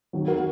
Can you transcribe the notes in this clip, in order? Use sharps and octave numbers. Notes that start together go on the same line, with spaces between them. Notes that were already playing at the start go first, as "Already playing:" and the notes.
D#2 D#3 F#3
F#4 A#4